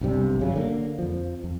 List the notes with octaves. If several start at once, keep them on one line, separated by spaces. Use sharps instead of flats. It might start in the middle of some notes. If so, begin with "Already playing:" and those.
B1 G2 C3 G3
G#1 C#3 F#3
D3 A#3
F2 F3
F2